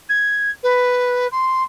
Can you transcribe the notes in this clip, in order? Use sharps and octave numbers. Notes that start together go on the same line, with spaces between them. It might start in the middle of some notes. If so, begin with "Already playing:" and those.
G#6
B4
C6